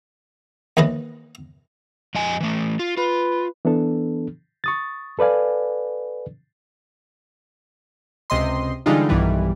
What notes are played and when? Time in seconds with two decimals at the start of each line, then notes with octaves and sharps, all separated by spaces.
0.77 D#2 E3 B4 D#5
2.15 F2 D#5 G#5
2.40 E3 A3
2.79 F4
2.97 F4 B4
3.65 E3 B3 D4 A4
4.64 C#6 D#6 A6
5.19 A4 B4 D5 F5 G#5
8.30 C#2 C3 D#5 C6
8.86 D3 E3 G3 G#3 D#4 F4
9.09 B1 G2 D#3 E3 G3